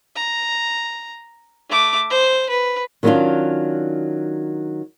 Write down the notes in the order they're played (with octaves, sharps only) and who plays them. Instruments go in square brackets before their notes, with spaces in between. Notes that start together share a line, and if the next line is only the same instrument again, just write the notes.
[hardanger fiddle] A#5
A3 D6
C5
B4
[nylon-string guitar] D#3 F#3 B3 C#4 D4 F4